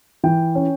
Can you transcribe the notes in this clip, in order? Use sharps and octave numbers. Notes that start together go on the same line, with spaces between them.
E3 G5
C#4